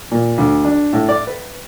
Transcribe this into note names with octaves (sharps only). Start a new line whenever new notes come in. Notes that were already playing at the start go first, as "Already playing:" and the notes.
A#2
D2
D4
A2
D5
B4